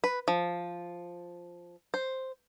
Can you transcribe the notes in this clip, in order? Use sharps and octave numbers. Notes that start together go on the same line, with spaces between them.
B4
F3
C5